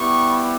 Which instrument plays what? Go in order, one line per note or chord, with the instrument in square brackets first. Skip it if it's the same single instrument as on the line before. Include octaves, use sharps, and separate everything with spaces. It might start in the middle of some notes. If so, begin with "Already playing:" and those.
Already playing: [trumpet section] G3 B3 E4 G4 C#6